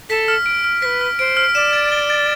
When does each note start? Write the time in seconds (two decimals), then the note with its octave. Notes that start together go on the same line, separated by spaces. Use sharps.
0.09 A4 B6
0.28 F6
0.46 D7
0.64 F6
0.82 B4 C5 B6
1.01 F6
1.19 C5 D7
1.37 F6
1.55 D5 E7
1.73 A6
1.92 G7
2.10 A6